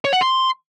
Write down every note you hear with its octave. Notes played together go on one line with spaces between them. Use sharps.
C#5
F#5
C6